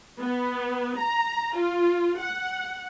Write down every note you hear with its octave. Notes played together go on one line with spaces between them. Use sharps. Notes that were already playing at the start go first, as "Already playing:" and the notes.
B3
A#5
F4
F#5